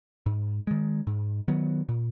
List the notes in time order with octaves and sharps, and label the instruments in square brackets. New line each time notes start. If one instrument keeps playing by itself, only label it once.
[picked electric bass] G#2
D#3 G#3
G#2
D#3 F#3 B3
A#2